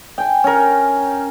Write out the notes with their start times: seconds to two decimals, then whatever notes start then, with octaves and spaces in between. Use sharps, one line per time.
0.18 G5 G#5
0.44 C#4 A#4